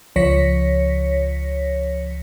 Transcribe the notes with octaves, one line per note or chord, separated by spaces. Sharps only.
C#2 F3 C#5 A#6 B6 C#7